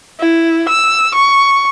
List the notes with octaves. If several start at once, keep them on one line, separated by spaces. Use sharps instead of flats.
E4
E6
C#6